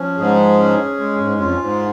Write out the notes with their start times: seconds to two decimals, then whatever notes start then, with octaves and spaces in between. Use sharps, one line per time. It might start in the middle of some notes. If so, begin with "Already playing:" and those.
Already playing: F3 C#4
0.18 G#2 G#4
0.58 C#4
1.00 G#3
1.15 F#2
1.20 G#2
1.36 F#2
1.40 F2 F4
1.60 G#2